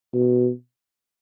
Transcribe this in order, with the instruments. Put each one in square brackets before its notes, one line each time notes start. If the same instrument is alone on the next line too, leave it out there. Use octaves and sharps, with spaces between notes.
[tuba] B2